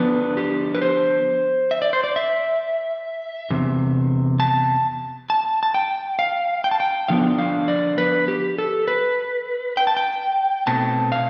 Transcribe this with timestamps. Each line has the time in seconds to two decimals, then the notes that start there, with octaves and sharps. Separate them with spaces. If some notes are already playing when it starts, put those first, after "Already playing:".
Already playing: D3 F3 B3 D4 B4
0.37 G4
0.75 B4
0.81 C5
1.71 E5
1.82 D5
1.93 C5
2.04 D5
2.16 E5
3.50 E2 C3
4.40 A5
5.30 A5
5.63 A5
5.74 G5
6.19 F5
6.64 G5
6.71 A5
6.80 G5
7.08 D3 F3 B3 D4 F5
7.38 F5
7.68 D5
7.98 B4
8.28 G4
8.58 A4
8.88 B4
9.77 G5
9.87 A5
9.97 G5
10.67 B2 A3 C4 A5
11.12 F5